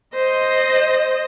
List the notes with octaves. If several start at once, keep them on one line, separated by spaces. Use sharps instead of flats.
C5 D#5